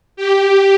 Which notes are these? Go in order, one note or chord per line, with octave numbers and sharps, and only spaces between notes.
G4